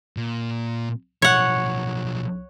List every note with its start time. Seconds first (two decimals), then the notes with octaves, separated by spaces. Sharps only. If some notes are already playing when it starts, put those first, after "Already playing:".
0.17 A#2
1.22 B1 F3 C#5 F#5